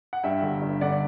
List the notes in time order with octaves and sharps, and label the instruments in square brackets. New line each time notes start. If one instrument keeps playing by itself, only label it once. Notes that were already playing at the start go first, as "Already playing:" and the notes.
[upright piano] F#5
G2 E5 G5
G1
G2
D3 D5 F#5